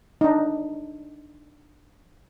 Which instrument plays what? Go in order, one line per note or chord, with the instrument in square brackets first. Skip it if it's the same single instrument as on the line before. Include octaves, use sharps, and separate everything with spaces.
[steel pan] D4 D#4